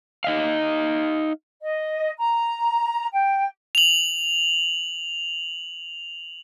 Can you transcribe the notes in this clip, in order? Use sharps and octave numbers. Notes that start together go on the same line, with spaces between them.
D#4 D#5 F5
D#5
A#5
G5
F7 F#7